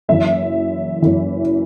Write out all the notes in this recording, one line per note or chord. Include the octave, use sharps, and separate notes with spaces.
F#1 F#2 E3 E5
F#1 F#2 E3